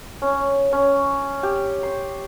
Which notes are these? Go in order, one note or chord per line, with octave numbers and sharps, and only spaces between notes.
C#4
C#4
G4
C6